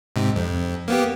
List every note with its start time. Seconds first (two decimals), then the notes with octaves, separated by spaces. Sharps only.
0.16 G#2 C3
0.36 F2
0.88 A#3 B3 G4